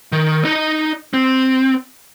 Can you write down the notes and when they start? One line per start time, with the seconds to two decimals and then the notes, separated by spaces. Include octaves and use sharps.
0.12 D#3
0.45 D#4 D#5
1.13 C4